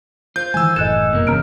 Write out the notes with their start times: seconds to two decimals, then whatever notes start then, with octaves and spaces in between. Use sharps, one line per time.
0.36 F4 C5 G6
0.54 D#3 E3 G#3 G#5 E6
0.76 F#1 A2 E3 A4 D#5 F#6 E7
1.11 F#1 C2 F#2 B2 A#3
1.27 G1 C#3 E3 A#5 F6 D7